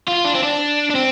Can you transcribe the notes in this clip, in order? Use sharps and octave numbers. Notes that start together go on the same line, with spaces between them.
F4
D4
C4
D4
D4
C4